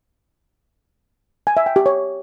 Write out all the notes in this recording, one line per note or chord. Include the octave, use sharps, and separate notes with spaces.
G#5
E5
G5
G4
C#5